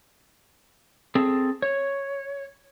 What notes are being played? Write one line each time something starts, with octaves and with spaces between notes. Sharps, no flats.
C4 G#4 A4
C#5